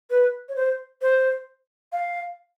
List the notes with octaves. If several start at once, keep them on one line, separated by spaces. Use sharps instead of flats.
B4
C#5
C5
C5
F5